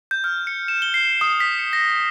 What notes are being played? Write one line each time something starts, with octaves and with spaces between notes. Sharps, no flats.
G6
F6
C#7
E7
G7
C7
D#6
B6
C#7
A#6